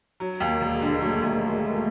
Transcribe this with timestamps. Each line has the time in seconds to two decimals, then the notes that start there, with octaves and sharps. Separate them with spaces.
0.20 F#3
0.40 D#2
0.48 A#3
0.61 E1
0.75 G#3
0.81 D3
1.01 F#3 A3
1.22 D#2